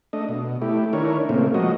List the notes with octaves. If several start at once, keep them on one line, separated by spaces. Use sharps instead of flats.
A3 D4 D#5
B2
A3 E4 G4
D#3 D4 E4 A#4 C#5
A#2 C#3 A3 A#3 C4
F3 F#3 G#3 A#3 F#4 D#5